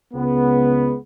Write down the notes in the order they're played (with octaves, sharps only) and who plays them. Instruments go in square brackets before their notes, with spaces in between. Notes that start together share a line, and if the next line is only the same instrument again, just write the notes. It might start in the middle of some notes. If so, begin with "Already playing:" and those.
[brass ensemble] C#2 C#3 G#3 B3